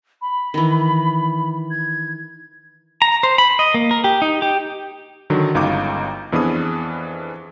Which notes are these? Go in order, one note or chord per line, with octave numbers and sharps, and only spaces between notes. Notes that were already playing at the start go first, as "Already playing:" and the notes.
B5
D#3 E3
G#6
A#5
C5
B5
D#5
A#3
A#4
G4
D#4
G4
D3 D#3 F#3
G1 C#2 D#4 F5 D6
F2 E3 B3 D4 G#4 D#6